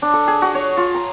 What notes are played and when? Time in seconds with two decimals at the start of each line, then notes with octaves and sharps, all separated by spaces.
0.02 D4
0.14 A4
0.28 G#4
0.42 F#4
0.55 C#5
0.77 F4
0.95 A#5